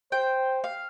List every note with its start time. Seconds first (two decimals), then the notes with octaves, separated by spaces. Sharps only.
0.12 C5 G5
0.64 F5